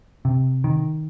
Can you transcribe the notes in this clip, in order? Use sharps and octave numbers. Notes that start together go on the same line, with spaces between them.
C3
D#3